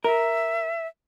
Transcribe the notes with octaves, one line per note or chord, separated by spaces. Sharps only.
A#4 E5